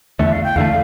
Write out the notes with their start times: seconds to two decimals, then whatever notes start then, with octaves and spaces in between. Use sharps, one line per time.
0.19 E2 D3 A3 E5
0.32 F5
0.44 G5
0.56 E2 D3 A3 F5